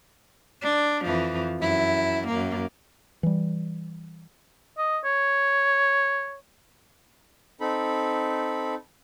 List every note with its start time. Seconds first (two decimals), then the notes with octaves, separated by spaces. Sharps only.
0.62 D4
1.05 F2 E3 F3
1.59 F#2 E4
2.28 F#2 A#3
3.23 E3 G3
4.78 D#5
5.05 C#5
7.60 C4 D#4 A4 B5